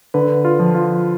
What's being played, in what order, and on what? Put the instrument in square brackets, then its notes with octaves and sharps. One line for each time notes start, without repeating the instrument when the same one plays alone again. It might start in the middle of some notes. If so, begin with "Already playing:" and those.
[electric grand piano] D3 B4
F4
F3
F4